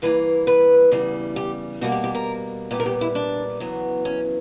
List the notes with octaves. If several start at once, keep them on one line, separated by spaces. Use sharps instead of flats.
G2 E3 A#3 B4
B4
E2 C#3 G3
G4
B2 G3 A#3 F#4
G4
G4
A#4
A#2 G3 B3 G4
A#4
G4
E4
D4
E2 C#3 F#3 B3
C#4